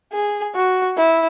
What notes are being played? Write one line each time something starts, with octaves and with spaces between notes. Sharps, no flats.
G#4
F#4
E4